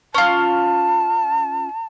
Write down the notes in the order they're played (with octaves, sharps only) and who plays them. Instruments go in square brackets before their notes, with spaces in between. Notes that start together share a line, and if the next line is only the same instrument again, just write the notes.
[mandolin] C#4 F4 [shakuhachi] A5